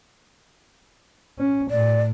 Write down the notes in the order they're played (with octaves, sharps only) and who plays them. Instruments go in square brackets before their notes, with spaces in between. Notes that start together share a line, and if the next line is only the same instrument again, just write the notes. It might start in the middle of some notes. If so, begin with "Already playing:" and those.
[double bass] C#4
[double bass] A2 [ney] D5